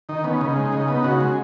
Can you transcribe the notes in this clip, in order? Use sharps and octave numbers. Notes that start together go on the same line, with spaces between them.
D#3 D#4
B3 C#4
C#3 D#4
G#3
C#3
B3
C#3 F#4
G#3